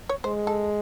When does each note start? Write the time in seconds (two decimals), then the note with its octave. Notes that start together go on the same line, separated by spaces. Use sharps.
0.09 C#5
0.24 G#3 C5
0.47 A4